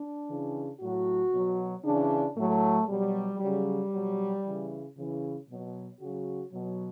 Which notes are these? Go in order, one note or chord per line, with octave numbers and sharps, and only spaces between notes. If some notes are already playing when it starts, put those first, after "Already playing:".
Already playing: D4
C#3 E3
A2 F#3 F#4
B2 F#3
C#3 E3 D4
A2 F#3 A3
B2 F#3 G3
C#3 F#3 G3
B2 F#3
C#3 E3
C#3 E3
B2 F#3
C#3 F#3 F#4
B2 F#3